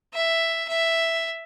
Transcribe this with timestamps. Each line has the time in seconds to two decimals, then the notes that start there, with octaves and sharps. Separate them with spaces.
0.14 E5
0.68 E5